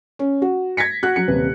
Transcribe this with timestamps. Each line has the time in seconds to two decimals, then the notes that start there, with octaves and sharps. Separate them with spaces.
0.19 C#4
0.42 F#4
0.77 G#6 A#6 B6 C#7
1.03 F#4 F#6
1.16 F#3 C#7
1.27 D#1 C3 B4